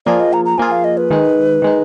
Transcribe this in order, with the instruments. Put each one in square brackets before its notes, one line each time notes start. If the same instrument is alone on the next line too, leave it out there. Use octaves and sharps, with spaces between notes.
[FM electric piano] F3 A#3 F4 G#4 [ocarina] D5
[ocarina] D#5
A#5
A#5
[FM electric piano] F3 A#3 F4 G#4 [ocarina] G#5
[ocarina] F5
D#5
B4
[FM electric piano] D#3 G#3 D#4
D#3 G#3 D#4